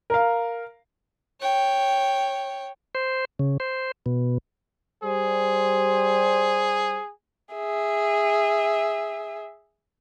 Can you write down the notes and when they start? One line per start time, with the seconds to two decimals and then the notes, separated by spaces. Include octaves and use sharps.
0.10 A#4 F5
1.40 C#5 G5
2.95 C5
3.39 C#3
3.60 C5
4.06 B2
5.03 G3 G#4 C5
7.54 G#4 E5